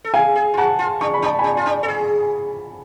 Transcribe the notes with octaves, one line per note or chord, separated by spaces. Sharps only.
A4
G#4 F5 G#5
G#4
F4
F#4 F#5 A5
F4
D4 C#6
B5
D4
A5
G#5 B5
D4
F4
D4
A4
G#4